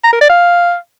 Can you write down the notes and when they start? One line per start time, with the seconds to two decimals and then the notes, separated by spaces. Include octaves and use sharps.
0.04 A#5
0.12 A#4
0.21 D5
0.29 F5